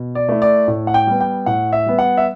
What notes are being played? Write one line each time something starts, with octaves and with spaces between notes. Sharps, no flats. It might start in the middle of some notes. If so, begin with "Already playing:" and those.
Already playing: B2
D5
A3 E4
D5
A2
F#5
G5
G3 B3
G5
A2 F#5
E5
G3 B3
F#5
E5